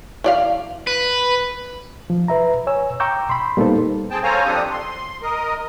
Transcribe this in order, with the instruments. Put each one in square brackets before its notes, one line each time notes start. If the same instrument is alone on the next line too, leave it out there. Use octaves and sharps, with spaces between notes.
[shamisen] E3 D5 F5
[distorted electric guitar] B4
[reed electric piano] F3
B4 E5 A#5
C#5 G#5 E6
G5 A#5 C#6 D6 E6 G6
B5 C6
G3 A#3 B3 D#4 A4 C5
[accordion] C4 G#4 G5 A5
A4 C5 C#5 F5 G#5 A#5
F2 C4 D4 G4 A4 D#6
C6
A#4 D#5